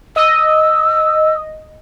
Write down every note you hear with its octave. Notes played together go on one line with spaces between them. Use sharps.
D#5 E6